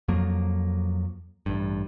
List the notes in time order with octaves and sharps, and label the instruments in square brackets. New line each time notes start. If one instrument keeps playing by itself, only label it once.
[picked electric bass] F2 F3 F#3 A#3
A1 G2